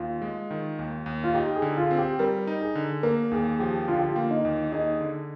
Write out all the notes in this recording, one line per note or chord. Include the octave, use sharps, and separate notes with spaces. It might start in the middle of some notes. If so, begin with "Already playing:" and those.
Already playing: D#2 F4
G#3
D#3
D#2
D#2
F4
D#4 G4
G#4
D3
F4
C4
G4
G3 A#4
D#4
G#4
D3
A#3 A#4
D#2 G#4
F3 G4
D3 F4
G4
A#3 F4
D#4
D#2
D#4 G#4
D3